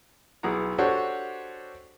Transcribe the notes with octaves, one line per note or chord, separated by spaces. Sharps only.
B1 E4 G#4 F#5 A#5
D4 F#4 G4 A4 C5 C#5